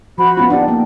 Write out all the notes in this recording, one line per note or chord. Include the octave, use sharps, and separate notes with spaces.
F3 F#4 C5 B5
B3 C#4 F4
D4 D#4 G4 D5 F#5
A#3 G5